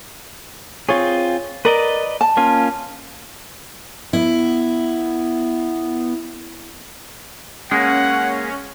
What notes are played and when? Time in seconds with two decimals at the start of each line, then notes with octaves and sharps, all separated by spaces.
0.89 C4 F4 G#4 C#5
1.65 A#4 B4 D5 D#5
2.21 A5
2.37 A#3 C#4 F4
4.13 B3 E4
7.71 G#3 A#3 C#4 F#5